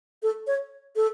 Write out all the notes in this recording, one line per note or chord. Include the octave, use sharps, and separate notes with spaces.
A4
C#5
A4